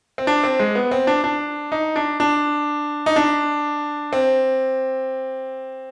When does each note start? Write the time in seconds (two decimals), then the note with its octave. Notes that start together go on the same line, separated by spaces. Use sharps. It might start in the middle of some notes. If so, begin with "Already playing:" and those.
0.18 C4
0.27 D4
0.43 C4
0.60 G#3
0.75 B3
0.91 C4
1.07 D4
1.24 D4
1.72 D#4
1.96 D4
2.20 D4
3.06 D#4
3.16 D4
4.13 C4